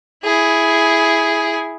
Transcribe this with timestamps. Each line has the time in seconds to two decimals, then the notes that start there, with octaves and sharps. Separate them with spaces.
0.24 E4 G#4